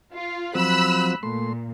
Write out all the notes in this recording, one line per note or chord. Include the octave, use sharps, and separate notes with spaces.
F4
F3 F#3 C4 B5 E6 F#6
A#2 A3 C6